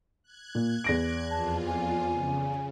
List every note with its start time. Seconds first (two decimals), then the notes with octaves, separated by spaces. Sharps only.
0.23 F#6 G#6
0.55 A#2
0.84 E2 A#6 D7
1.31 F2 F4 A5
1.67 G#5
2.09 C#3